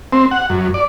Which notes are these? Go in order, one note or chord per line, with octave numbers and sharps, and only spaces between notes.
C4
F#5
F#2
D5